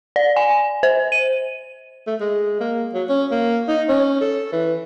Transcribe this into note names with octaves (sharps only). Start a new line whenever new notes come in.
D5
G#5
C5
D#7
A3
G#3
A#3
F#3
C#4
A#3
D#4
C#4
A4
E3